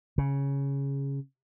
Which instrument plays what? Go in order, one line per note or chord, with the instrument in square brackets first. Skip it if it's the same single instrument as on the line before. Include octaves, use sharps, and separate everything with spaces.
[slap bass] C#3